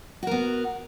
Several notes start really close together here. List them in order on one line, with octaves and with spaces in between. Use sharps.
F#4 A#4 B3